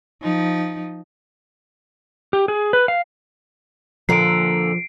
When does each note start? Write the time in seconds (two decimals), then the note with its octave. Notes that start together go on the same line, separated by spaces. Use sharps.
0.22 F3 D#4
2.33 G4
2.48 G#4
2.73 B4
2.88 F5
4.09 A#2 D3 F3 C7 D7